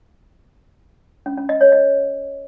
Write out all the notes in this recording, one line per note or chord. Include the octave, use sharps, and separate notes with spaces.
C#4
C#4
D#5
C#5
D#5